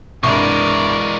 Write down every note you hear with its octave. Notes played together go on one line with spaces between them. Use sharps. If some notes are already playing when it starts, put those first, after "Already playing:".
C2 G2 E3 G#3 A#4 D5 C#6